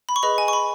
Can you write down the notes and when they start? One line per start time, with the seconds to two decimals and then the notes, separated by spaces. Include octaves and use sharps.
0.09 B5
0.16 C#6
0.23 G#4 B4 D#5 B5
0.38 G#5
0.48 C#6
0.53 B5